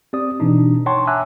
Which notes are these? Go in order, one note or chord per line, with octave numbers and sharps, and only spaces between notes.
C4 G4 D5 D#6
B2 E3 D4 D#4
C#5 F#5 G5 A5 C6 C#6
E5 G#5 A#5 D6 E6 F#6